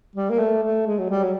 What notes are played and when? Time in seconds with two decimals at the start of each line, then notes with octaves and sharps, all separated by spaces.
0.15 G3
0.30 A#3
0.39 A3
0.63 A3
0.86 G#3
0.98 F#3
1.10 G3
1.24 F#3